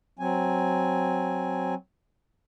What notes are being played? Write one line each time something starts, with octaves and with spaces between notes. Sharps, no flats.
F#3 C4 G#5